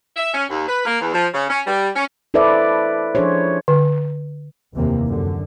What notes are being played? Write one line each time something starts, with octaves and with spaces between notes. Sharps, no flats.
E5
C#4
D#2
B4
A#3
E2
F3
C#3
C#4
G3
C#4
E4 A4 B4 C5 D5 E5
F3 D4 G#4 C5 C#5
D3
F1 D#2 C3 E3 A#3
F#2 D3